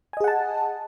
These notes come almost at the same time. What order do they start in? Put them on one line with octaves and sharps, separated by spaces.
G#5 D#5 G#4 F#5 A5